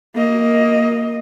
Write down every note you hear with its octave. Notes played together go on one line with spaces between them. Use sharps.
A#3 D#5